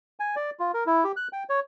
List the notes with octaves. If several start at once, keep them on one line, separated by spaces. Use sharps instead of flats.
G#5
D5
F4
A#4
E4
G4
F#6
G5
C#5